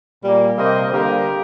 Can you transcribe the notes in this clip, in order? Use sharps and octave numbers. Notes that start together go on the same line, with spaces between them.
A#2 G3 A#3
C3 G3 A#3 C5 D#5
D3 G3 A#3 G4 A#4